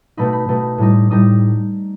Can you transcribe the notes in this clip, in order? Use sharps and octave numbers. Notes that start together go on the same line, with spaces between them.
B2 A3 D#4 B5
B5
B2 A3 D#4
A2 G3 D#4
A2 G3 D#4 D#6